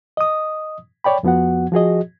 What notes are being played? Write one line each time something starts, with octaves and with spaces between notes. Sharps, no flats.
D#5 D#6
C#5 D5 G5 B5
F2 F3 B3 F#4 F#5
F3 F#4 G#4 D#5